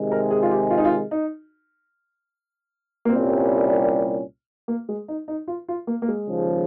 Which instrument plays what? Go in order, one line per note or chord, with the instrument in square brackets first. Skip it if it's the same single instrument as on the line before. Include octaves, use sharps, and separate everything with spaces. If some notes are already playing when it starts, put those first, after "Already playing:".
Already playing: [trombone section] C3 D#3 G#3
[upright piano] A#4
G#4
F4
G4
F4
D#4
F4
D#4
A#3
[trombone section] C2 A#2 G3 C#4 [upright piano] C4
[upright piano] A#3
G#3
D#4
D#4
F4
F4
A#3
A#3
G#3
[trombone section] D#2 C#3 F3